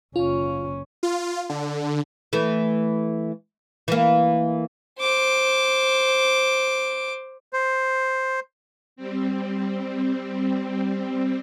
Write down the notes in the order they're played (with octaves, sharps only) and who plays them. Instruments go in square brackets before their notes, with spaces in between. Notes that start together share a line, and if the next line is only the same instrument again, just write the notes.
[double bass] F#1 C#4 [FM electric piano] F4
[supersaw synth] F4
D3
[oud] E3 A3
E3 A#3
[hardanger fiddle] C5 D6
[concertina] C5
[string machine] G3 C4